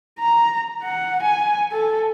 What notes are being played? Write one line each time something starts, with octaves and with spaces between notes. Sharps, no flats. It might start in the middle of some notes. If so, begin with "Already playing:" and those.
A#5
F#5
G#5
A4